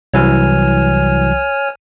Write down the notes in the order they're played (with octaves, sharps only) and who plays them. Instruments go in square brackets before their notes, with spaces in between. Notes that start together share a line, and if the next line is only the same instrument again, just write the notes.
[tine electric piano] C2 E3 F#3 [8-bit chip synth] C#5 G#5 F6